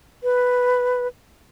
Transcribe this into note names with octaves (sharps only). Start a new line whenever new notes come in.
B4